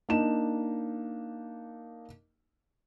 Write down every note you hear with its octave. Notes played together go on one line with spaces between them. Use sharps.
A#3 D4 D#4 E7